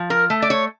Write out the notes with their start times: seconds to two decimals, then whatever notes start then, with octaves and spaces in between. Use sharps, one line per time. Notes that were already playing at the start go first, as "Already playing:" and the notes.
Already playing: F3
0.10 A#4
0.30 A3
0.42 D5
0.50 C#5